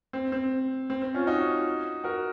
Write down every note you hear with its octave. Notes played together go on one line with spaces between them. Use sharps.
C4
C4
C4
C4
C#4 F4
D#4 F#4
F#4 A#4